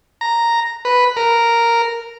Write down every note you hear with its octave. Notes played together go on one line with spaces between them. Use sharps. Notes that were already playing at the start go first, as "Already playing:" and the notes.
A#5
B4
A#4